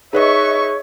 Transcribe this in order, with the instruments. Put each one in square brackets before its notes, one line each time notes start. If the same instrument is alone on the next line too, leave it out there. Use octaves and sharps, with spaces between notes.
[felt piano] D#4 B4 D#5 [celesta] G#4 [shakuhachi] C#5 [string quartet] E5 C#6